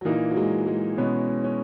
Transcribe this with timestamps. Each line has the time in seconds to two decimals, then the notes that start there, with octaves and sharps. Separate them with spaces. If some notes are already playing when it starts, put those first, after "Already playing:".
0.01 F#3
0.05 A#2 E3 A#3 D#4
0.31 F#3
0.37 G#3
0.67 G#3
0.98 B2 G#3 B3 C#4
1.44 C#4